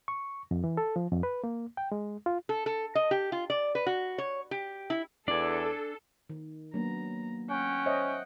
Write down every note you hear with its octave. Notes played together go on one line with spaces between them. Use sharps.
C#6
F2
E3
A4
F3
F2
B4
A#3
G5
G#3
F4
A4
A4
D#5
G4
F4
D5
B4
F#4
C#5
G4
E4
E2 D4 A4 D5 G#5
D#3
F#3 A#3 B3 D4 A#5
C#4 F#5 G5
C5 C#5 D#5 E5